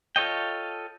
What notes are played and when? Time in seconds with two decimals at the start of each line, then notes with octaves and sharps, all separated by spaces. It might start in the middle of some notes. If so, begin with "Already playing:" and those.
0.16 F4 A4 C#5 D#5 G5